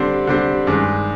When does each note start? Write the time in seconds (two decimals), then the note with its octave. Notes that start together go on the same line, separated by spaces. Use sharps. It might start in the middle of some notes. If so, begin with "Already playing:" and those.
Already playing: D3 G3 C4
0.27 D3 G3 C4
0.67 G2 D#3 G#3